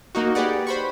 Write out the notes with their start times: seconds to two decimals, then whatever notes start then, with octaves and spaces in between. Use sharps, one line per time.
0.15 A#3 D#4 F#4
0.35 G4 G#4 B4 D5 F#5
0.67 C5 B5 C#6